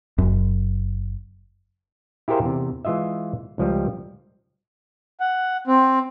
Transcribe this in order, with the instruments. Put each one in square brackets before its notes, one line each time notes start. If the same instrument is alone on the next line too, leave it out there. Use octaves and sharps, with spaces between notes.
[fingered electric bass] F#1 F#2
[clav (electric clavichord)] E4 G4 G#4 A#4 C5 F5
E2 C3
E3 G#3 F4 D#5 E5
C#2 F3 G3
[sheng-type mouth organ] F#5
C4